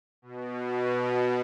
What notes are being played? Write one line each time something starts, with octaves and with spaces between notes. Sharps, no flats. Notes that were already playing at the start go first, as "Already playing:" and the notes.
B2